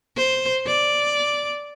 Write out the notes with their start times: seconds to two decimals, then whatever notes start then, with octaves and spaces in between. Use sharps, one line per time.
0.17 C5
0.67 D5